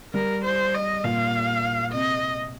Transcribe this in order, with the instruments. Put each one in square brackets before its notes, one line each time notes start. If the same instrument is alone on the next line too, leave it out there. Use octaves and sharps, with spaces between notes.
[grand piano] G3 [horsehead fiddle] A#4
[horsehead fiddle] C5
D#5
[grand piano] A#2 [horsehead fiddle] F5
[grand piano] C3 [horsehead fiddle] D#5